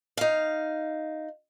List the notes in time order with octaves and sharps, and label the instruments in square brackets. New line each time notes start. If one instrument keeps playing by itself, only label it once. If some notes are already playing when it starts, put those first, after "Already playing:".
[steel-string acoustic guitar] D#4 F5